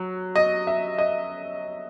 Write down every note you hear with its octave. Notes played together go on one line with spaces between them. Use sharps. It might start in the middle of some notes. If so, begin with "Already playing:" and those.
Already playing: F#3
D#5
E5
D#5